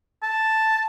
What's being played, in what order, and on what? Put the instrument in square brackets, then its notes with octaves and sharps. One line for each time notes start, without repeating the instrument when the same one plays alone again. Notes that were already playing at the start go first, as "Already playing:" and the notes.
[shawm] A5